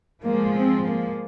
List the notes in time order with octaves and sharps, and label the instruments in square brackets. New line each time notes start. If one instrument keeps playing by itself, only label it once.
[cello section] F3 G#3 [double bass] A#3
[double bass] C4
A#3